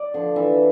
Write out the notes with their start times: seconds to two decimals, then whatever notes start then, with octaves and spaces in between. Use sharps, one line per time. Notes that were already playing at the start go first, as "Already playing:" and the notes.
Already playing: D5
0.14 D3 F3
0.36 E3 E5